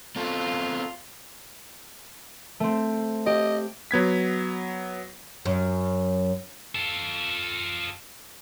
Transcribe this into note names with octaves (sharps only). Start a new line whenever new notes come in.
B3 C4 F4 A4
A3 C4
G4 D#5
F#3 B3 G#6 B6
F#2
F4 A4